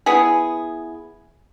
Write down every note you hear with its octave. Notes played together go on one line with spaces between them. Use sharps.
B3 E4 G#4